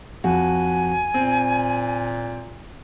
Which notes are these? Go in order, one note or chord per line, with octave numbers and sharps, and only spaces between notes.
F2 F#4 G#5
A#2 C4